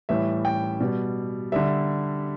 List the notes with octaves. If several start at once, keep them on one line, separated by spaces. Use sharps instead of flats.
A2 E3 G3 E5
G5
B2 G3
D3 G3 E5